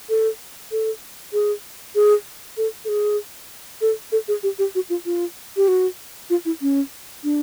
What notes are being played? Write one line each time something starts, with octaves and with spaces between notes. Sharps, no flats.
A4
A4
G#4
G#4
A4
A4
G#4
A4
A4
G#4
G4
G4
F#4
F4
F4
G4
F#4
F4
E4
C#4
D4